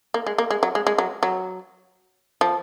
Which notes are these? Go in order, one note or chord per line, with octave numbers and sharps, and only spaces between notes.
A#3
G#3
A#3
G#3
F#3
G#3
G#3
F#3
F#3
F3